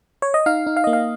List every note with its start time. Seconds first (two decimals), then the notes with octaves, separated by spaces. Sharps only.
0.22 C#5
0.34 D#5
0.46 D#4 F5
0.67 D#4
0.77 F5
0.84 D#5
0.87 A#3
0.93 F5